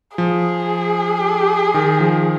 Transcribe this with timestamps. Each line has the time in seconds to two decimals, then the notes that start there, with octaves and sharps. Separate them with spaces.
0.17 F3 G#4
1.74 D#3
2.00 F3